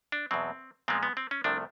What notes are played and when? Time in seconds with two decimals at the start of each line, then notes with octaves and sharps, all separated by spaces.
0.12 D4
0.31 E2 B2 F#3 C4
0.88 A#2 F3 G#3 B3 C4
1.03 B3
1.17 C4
1.31 C#4
1.44 C2 C3 F3 A3 D4